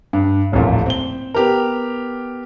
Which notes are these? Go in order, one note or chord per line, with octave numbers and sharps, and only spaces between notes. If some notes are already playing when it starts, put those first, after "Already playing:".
G2
D#1 A1 F2 A#2
C4 G7
B3 G4 A#4